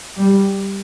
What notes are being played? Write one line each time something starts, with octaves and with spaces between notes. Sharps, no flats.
G3